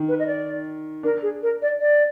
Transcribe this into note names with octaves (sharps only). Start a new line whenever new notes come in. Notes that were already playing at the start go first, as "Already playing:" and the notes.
Already playing: D#3
B4
D#5
D5
D4 A#4
G#4
A#4
D5
D5